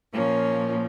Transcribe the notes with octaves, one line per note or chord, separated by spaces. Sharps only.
A#2 F3 A#3 C#4